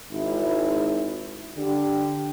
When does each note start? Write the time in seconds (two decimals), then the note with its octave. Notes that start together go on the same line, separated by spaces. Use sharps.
0.12 G#1 E4
1.57 D3 G4